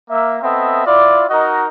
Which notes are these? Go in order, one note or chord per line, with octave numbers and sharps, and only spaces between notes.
A#3 E5
B3 C4 A4 D#5 E5
E4 F4 D5
D#4 F#4 A#4 D#5